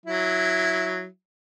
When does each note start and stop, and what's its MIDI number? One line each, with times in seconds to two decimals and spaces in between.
0.06 1.06 54
0.06 1.06 64